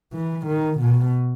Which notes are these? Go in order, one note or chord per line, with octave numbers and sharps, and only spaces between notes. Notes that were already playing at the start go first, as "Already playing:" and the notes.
E3
D#3
B2